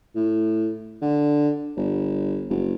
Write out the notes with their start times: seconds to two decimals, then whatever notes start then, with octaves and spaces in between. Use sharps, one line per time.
0.15 A2
1.02 D3
1.77 G1
2.50 F#1